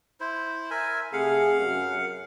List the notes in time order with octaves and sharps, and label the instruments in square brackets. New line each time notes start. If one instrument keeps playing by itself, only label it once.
[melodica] E4 C5
A#4 E5 G#5
[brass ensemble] C3 A3 G#4 [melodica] F5 F#5
[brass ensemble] F#2